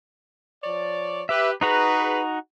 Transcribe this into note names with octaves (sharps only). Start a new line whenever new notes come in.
F3 C#5 D5
G4 B4 E5
D#4 F#4 G#4 B4 A#5